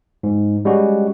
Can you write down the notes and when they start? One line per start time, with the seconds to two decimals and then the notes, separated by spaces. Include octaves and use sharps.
0.23 G#2
0.65 G3 G#3 C#4 F#4